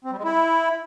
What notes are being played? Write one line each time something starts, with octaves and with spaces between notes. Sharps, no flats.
C4
G3
G#3
E4